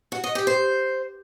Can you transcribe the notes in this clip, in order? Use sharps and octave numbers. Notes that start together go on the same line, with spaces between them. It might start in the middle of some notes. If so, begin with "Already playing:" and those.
F#4
D#5
G4
C5